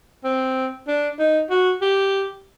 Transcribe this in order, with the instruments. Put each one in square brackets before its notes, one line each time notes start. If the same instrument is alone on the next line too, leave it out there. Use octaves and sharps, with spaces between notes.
[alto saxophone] C4
D4
D#4
F#4
G4